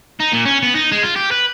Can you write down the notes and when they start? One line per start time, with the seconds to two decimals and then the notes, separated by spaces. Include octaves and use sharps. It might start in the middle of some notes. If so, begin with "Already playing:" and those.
0.20 D#4
0.33 A#2
0.46 C#4
0.63 B3
0.75 D#4
0.91 G#3
1.03 F4
1.16 G4
1.31 B4